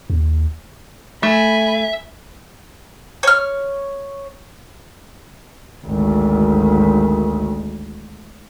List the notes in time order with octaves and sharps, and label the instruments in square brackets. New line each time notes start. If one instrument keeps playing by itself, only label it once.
[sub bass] D#2
[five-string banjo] A3 [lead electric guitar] E5 [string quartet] G#5 B5
[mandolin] C#5 F6
[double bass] G#1 D2